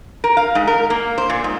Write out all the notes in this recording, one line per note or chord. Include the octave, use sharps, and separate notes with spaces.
A#4
F5
G#2
A#4
A#3
C5
A#2
G#2